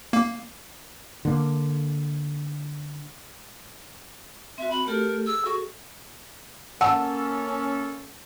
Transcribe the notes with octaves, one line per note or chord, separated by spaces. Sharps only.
A#3
D3 A#3
C4 F#4 E5
F#4 B5
A3 G4 A4 A#4
G#4 A4 E6
F#4
A#3 C#4 A4 F#5 A5 E6